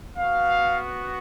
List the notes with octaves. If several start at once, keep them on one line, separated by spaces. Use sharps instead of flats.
B3 F#4 F5